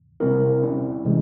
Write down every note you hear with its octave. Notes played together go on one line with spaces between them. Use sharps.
C3 G3 C4 E4 A#4
G3 C#4 E4
C3 E3 G#3